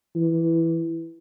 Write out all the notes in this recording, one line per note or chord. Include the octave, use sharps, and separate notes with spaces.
E3